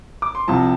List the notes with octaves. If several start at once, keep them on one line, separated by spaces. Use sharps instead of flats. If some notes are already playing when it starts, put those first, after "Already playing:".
D6
C6
C2 C3 F3 A5